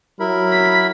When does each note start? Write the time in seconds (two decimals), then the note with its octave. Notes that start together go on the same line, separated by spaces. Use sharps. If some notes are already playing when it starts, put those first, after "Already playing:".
0.20 F#3 E4 A#4 B5
0.52 B6